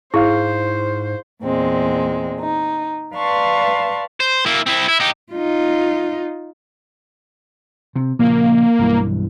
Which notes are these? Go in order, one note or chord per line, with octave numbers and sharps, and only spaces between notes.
G#2 E4 G#4 C5 F5 C#6
E2 A#2 G#3 C4
D#4
B4 D5 F5 A5 C6 C#6
C5
A#3 E4
C4 E4
E4
D#4 G4
D#4 F4
C3
A#2 C#3 F3 A#3
B1 G2 E3